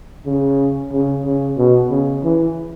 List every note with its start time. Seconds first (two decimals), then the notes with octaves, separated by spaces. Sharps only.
0.26 C#3
0.92 C#3
1.25 C#3
1.58 B2
1.91 C#3
2.24 E3